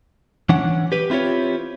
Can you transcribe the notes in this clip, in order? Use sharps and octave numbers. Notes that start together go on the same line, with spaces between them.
E3 C#4 D4 F#5
G4 B4
C4 E4 F4 G4 C#5